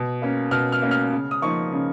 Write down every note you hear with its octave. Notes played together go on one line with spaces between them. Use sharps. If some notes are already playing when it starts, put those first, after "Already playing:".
Already playing: B2
A#3 C#4
B2 F6
F6
A#3 C#4
F6
C#3
D#6
F3 A#3 D#4 C#6
C#3